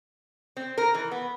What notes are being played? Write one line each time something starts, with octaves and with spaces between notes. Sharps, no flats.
C4
A#4
E3
B3